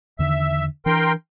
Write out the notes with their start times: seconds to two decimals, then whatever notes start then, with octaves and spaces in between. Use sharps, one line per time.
0.19 E2 D3 D#3 E5
0.86 E3 D4 A#4 G5 C6